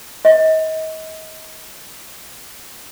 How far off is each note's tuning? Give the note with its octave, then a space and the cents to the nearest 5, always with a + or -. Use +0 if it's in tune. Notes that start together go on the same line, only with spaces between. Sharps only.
D#5 +30